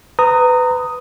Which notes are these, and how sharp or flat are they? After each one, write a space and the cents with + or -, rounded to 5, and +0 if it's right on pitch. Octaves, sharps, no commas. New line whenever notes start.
B4 +20 A#5 -20 D#6 +0